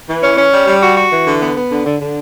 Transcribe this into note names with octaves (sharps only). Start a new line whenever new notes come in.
E3
C#4
C#4
G3
G3
F#4
F#4
E3
D3
B3
B3
D3
D3
D3